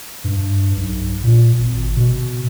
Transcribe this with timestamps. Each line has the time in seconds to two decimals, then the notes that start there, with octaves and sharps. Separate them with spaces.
0.24 G2
0.77 B1
1.24 A#2
1.59 G#1
1.96 B2